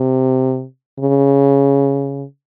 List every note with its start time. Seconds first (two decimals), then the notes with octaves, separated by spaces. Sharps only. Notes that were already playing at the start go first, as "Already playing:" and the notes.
Already playing: C3
0.99 C#3